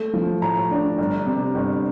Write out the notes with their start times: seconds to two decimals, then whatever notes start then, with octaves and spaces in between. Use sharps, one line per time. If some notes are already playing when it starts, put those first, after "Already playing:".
Already playing: A3
0.13 F3
0.42 A2 A#5
0.71 D4
0.98 G1
1.27 C3
1.55 G1